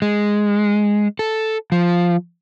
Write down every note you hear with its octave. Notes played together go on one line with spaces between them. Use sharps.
G#3
A4
F3